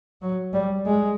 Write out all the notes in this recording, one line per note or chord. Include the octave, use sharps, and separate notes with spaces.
F#3
G3
G#3